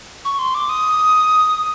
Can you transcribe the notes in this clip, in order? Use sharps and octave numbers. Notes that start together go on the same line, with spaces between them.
C#6
C6
D6
D#6